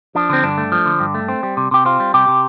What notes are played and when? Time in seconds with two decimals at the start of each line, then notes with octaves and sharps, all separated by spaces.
0.15 F3 D4
0.30 D3 C4
0.43 G2 D4
0.58 A3
0.72 F3
0.86 D3
1.00 G2
1.14 A3
1.29 C4
1.43 G3
1.57 C3
1.71 C3 G4
1.85 C4 F4
2.00 G3
2.14 C3 G4
2.28 C3